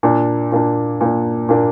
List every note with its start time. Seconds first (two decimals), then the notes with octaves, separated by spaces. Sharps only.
0.03 A#2 A#3 D4
0.52 A#2 A#3 D4
1.01 A#2 A#3 D4
1.49 A#2 A#3 D4